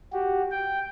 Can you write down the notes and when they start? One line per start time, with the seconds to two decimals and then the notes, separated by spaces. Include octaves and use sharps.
0.12 F#4 G4
0.51 G5